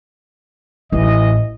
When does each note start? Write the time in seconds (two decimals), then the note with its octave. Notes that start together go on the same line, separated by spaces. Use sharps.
0.92 A1 E3 D#5